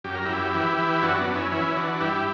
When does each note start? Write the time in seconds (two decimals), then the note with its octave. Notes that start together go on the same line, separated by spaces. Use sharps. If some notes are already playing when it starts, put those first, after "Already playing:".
0.04 F#2 G4
0.15 A#4
0.25 F#2 E4 G4
0.54 E3
0.78 E3
1.02 F#2 D4 F#4
1.19 B3 D4
1.27 F#2
1.35 C#4 E4
1.52 E3 C#4 E4
1.76 E3 D4 F#4
1.93 F#4
2.01 G2 E4 G4